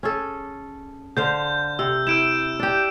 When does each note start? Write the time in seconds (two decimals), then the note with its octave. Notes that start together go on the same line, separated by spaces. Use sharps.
0.03 C#4 G#4 A4
1.17 D3 C5 F5 G6
1.79 C3 E6
2.07 E4 E6 D7 E7
2.59 D4 G4